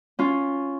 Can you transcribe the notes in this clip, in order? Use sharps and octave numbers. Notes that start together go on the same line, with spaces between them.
C#4 F4